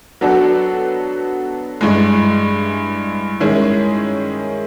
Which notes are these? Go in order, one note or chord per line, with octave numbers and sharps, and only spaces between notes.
F#3 B3 D4 F#4 A4
G2 E3 G#3
D#3 G#3 C#4 E4 G#4